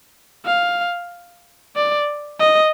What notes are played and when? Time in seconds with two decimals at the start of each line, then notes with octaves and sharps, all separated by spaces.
0.46 F5
1.76 D5
2.40 D#5